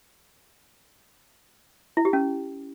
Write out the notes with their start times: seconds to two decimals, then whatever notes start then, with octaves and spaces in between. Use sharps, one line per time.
1.97 E4
2.05 G4
2.13 C#4